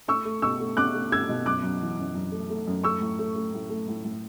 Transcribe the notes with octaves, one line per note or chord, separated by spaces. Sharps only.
A3 C#6 E6
A3
B2 C#6 E6
A3
B2 D6 F#6
A3
A3 E6 G#6
B2
F#2 D6 F#6
F#2
E3
F#2
F#2
A3
A3
F#2
A3 C#6 E6
A2
A3
A3
A2
A3
A2
A2